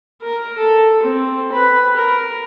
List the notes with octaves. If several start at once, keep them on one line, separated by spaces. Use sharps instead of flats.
A#4
A4
C4
B4
A#4